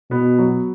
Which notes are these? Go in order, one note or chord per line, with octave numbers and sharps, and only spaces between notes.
B2 B3
F#3